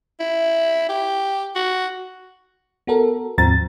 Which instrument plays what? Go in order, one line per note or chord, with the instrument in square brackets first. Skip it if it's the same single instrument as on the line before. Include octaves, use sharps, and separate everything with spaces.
[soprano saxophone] E4
G4
F#4
[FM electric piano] B3 F#4 A4 A#4
D#2 G#2 F3 C4 A#5 A6